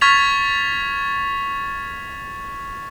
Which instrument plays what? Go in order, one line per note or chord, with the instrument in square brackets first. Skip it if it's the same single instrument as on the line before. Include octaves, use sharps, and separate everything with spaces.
[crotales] C#6 F6 G#6 A6 B6 F7